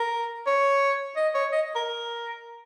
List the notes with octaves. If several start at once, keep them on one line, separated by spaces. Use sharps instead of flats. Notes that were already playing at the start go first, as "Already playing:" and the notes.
Already playing: A#4
C#5
D#5
C#5
D#5
A#4